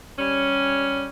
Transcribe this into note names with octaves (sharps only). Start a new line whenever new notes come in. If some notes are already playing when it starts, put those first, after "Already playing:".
G3 C#4